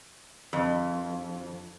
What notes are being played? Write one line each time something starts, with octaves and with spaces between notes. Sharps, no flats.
F2